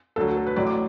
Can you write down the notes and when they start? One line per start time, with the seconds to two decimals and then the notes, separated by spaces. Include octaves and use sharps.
0.16 D2 D3 F#3 A4
0.27 F#4
0.37 A4
0.47 B4
0.56 A1 A2 F#3 D5
0.67 D6